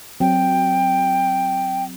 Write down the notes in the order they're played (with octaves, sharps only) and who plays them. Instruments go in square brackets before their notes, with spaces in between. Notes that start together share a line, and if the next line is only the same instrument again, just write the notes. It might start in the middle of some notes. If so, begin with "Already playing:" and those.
[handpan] F#3 C4 [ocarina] G5